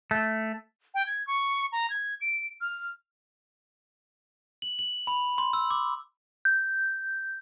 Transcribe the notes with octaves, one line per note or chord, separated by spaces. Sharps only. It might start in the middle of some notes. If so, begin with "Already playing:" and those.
A3
G5
G#6
C#6
A#5
G#6
D7
F6
F#7
F#7
B5
C6
E6
D6
G6